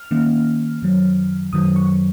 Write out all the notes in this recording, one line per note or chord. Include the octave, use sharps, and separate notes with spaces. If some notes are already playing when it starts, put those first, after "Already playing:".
Already playing: F6
D#3 A#3 C#4
F#2 D#3 F#3
F#2 D#3 F#3 D#6
C#6